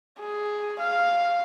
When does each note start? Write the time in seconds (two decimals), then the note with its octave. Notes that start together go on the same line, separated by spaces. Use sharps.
0.19 G#4
0.79 F5